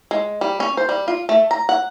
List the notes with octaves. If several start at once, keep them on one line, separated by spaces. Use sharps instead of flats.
G#3
G3
C#4
C5
G3
F4
A3
A#5
F#5